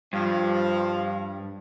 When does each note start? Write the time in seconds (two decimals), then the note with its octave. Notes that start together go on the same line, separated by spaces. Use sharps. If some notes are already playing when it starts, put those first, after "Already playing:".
0.13 G2 F3